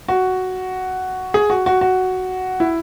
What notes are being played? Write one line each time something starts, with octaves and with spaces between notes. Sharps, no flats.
F#4
G#4
F#4
F#4
F#4
E4